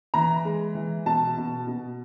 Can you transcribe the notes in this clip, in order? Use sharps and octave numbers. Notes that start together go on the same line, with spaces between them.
E3 A#5
G#3
E3
B2 A5
B2
B2